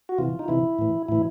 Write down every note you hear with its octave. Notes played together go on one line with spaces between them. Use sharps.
F#4
C3 E3 F4
D#4
C3 E3 E4
A2 E3
A2 E3 E4